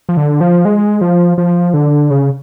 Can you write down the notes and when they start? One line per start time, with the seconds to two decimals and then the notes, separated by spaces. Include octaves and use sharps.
0.09 F3
0.17 D3
0.41 F3
0.65 G#3
1.01 F3
1.38 F3
1.74 D3
2.10 C#3